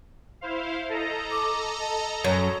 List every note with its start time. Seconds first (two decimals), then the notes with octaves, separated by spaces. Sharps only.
0.41 E4 C5 F5
0.89 A4 D#5 A#5
1.31 D6
1.80 A5
2.24 F#2 C#5